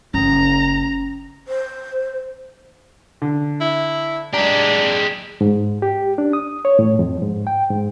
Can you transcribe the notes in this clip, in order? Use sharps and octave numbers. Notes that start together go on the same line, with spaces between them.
F#1 C#4 A#5
C5
D3
E4
G#3 D4 G4 A#5
G#2
G4
D4
D#6
C#5
A2
F2
G#2
G5
G#2